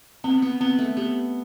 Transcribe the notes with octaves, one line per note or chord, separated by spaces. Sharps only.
B3 C4
B3
B3 C4
A3
B3 G4